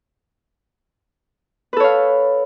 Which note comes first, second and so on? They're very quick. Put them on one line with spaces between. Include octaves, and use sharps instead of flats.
B4 A4 C#5 F5